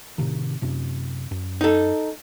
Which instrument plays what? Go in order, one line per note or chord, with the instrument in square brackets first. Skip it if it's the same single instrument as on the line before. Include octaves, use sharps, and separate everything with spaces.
[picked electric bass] A2 C3 D#3
F#2 C3
F#2
[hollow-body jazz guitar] D#4 A4